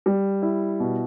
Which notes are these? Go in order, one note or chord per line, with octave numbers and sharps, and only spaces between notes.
G3
E4
B2